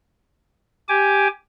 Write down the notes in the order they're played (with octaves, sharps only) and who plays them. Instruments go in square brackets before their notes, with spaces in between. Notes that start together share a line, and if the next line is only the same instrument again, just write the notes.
[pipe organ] G4 G#5 D6